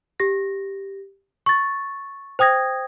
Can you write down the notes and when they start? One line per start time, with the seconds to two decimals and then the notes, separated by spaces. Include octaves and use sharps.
0.20 G4 A#6
1.46 C#6 A6
2.39 C5 G5 D#6 G#6 A#6